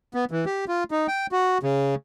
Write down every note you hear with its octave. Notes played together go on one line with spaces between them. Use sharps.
B3
E3
G4
F4
D#4
G5
F#4
C#3